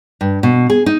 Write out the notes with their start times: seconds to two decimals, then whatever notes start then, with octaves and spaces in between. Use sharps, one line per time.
0.21 G2
0.43 B2
0.70 G#4
0.86 D#4